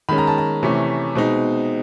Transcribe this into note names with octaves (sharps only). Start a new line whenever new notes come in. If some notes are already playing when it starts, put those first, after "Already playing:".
D#3 G#3 C#4 B5
A#5
A5
A#5
C3 E3 A3 C#4
B2 G#3 C4 D#4